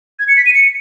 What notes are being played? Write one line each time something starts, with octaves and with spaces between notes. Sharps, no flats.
G#6
C#7
B6
D#7
C#7